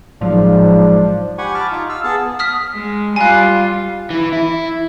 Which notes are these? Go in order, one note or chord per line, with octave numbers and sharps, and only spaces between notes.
A1 G#2 F3 F#3 D4
G4 F#5 G#5 B5 C#6
A5 B5 D6 F6
D#4 F4
F5 E6 F6
B3 G#4 A5
D#6 F6 B6
G#3
G3 F4 G#5 F#6
E3
E4